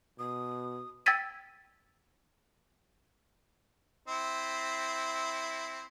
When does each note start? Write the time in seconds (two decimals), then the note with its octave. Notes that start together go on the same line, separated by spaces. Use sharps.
0.19 B2 D#6
1.06 G5 E6 G#6 A6 B6 D#7
4.08 C4 E4